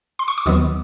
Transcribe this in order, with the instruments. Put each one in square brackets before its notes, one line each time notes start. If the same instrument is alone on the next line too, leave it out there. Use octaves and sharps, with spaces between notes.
[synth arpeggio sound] C6
C#6
D6
D#2 D#3 F#3 B3 D#6